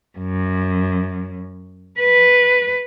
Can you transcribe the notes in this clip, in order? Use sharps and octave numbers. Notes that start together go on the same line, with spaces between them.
F#2
B4